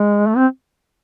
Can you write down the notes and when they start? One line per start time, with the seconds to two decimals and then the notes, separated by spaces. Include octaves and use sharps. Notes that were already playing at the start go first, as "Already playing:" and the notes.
Already playing: G#3
0.27 A3
0.37 C4